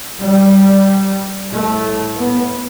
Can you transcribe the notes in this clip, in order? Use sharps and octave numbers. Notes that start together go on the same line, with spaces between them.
G3
A2 A3
B3